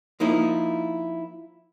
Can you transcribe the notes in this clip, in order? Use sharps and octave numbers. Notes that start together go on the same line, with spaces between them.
F3 A#3 D#4 E4